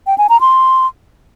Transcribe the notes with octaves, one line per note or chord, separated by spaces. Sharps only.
G5
G#5
A#5
C6